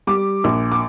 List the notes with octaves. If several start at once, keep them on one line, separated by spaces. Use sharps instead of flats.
G3 D6
A#1
D6